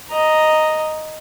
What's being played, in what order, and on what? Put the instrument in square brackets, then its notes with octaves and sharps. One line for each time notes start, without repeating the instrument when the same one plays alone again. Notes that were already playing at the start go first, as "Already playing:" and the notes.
[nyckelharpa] D#5 A#5